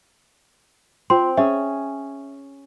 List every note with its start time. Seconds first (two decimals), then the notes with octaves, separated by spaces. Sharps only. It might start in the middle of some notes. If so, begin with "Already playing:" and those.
1.10 C4 F4 C6
1.37 C#4 G#4 E5